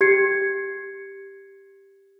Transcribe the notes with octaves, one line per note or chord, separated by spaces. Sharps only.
G4 G#6 C7 C#7